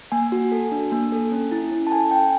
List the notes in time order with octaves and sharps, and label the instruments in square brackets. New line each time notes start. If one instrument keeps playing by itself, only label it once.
[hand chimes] A#3 G#5
F#4
A4
D4
A#3
A4
C#4
E4
C#4
A5
A4 G#5
C#4 G5